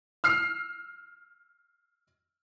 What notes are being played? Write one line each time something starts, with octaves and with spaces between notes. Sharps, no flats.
E6 F6 C7